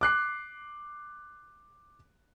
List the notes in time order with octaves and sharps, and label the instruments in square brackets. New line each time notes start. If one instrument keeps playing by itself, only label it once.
[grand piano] D6 F#6 C7